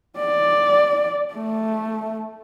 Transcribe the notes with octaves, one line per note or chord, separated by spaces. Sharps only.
D5
A3